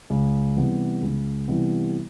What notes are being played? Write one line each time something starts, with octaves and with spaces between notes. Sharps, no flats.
C#2
C3 E3 G3 B3
C#2
C3 E3 G3 B3